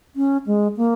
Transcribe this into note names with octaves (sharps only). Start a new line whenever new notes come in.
C#4
G#3
A#3